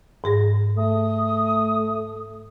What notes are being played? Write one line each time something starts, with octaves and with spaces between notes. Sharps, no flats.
G#2 G#4 A#6
A3 D#6